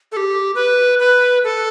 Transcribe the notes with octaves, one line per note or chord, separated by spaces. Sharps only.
A4
G4
B4
B4
A4